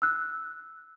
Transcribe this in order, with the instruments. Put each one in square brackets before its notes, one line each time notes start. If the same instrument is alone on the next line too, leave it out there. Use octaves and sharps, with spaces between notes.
[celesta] E6 F#6